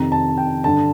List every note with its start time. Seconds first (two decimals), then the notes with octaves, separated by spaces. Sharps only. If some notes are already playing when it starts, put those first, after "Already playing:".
Already playing: F2 C3 D#3 A#5
0.12 A5
0.38 G5
0.64 G2 D3 A5